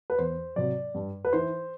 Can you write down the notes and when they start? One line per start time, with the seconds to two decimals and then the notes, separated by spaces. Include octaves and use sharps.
0.10 B4
0.18 E2 C5
0.56 C3 F#3 D5
0.94 G2
1.25 B4
1.33 E3 C5